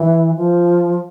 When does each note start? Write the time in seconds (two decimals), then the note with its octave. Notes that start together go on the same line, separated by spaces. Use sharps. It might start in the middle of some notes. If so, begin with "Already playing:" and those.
Already playing: E3
0.36 F3